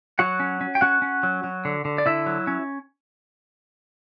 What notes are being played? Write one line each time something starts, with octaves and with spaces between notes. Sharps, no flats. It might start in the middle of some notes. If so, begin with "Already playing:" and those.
F#3 F#4 F#5
C#4
C#4
G5
C#4 F#4 F#5
C#4
F#3
F#3
D3
D3
D5
D3 E4 E5
F#3
C#4